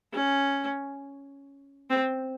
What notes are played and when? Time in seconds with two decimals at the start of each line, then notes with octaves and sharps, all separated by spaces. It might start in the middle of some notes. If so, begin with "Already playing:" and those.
0.13 C#4
1.90 C4